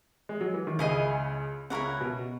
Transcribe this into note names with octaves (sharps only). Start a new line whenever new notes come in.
G#3
F#3
E3
D#3
C#2 C#3 E4 G#4 D#5
C#2 C#3 E4 A#4 C#5 F#5
B2